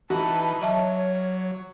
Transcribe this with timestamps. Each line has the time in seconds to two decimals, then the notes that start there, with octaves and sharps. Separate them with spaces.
0.10 E3 D#4 F#4 B4 A5
0.62 F#3 C#5 D#5 E5 A5